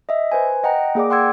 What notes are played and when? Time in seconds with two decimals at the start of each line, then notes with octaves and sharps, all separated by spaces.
0.09 D#5 E5
0.32 B4 C5 G#5
0.64 D#5 F#5 G5 A#5
0.95 A#3 G#4 D5 D6
1.10 F#5 G5 C6 D6 E6 G#6